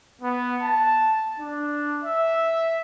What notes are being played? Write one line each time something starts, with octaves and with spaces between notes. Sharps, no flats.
B3
A5
D4
E5